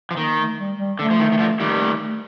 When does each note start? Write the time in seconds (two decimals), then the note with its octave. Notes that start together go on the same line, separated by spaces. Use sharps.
0.11 F3
0.17 D#3 A#3
0.38 A3
0.58 G3
0.78 G3
0.99 D3 A3
1.10 F3
1.20 D#3
1.32 D#3
1.39 D3 F3
1.60 D#3 G3
1.80 A3
2.01 A3